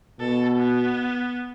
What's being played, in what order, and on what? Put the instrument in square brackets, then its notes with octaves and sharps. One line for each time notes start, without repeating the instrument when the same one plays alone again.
[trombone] B2 [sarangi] A4
[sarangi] B3